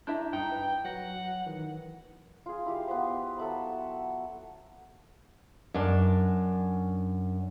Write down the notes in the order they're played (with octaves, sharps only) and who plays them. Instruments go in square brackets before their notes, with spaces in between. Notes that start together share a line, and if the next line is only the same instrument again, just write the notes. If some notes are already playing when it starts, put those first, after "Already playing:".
[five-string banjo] D4 E4 E5 [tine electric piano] A#5 G6
[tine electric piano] G2 [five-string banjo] D#4 [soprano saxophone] G5
[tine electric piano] B4
[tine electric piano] F#3 A#6 [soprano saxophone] F#5
[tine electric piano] D#3 E3
[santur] F4 G#4
E4 G4 F5
B3 C5
F#3 A4 E5 B5
[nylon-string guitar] F#2 D4